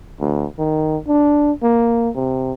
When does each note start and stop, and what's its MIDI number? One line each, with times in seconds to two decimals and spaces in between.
0.20 0.45 38
0.58 0.97 51
1.08 1.52 62
1.62 2.10 58
2.16 2.52 48